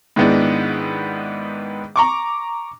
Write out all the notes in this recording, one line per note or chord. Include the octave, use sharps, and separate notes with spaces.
G#2 D#3 G#3 B3 D4 E4
A#5 C#6 D6